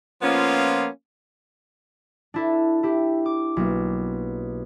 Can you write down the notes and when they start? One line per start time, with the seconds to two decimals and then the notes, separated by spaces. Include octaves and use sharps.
0.22 F3 A#3 B3 C#4 F4
2.34 D4 E4 A4
2.83 E4 G4
3.26 D6
3.57 B1 A#3